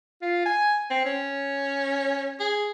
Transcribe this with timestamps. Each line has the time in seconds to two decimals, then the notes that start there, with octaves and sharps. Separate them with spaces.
0.22 F4
0.46 G#5
0.90 C4
1.05 C#4
2.40 G#4